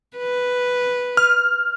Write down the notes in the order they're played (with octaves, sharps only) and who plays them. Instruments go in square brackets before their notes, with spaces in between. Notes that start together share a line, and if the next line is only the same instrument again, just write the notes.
[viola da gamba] B4
[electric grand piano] F6